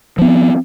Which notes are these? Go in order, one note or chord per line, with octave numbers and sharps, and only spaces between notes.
F3 B3 C4